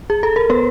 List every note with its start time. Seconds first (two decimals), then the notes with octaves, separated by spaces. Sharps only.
0.10 G#4
0.23 A4
0.36 A#4
0.50 B3 B4